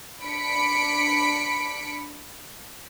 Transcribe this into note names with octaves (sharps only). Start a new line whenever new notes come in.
D4 B5 B6 C#7 D7